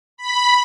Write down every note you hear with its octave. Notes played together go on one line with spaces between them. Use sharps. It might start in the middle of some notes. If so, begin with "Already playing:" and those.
B5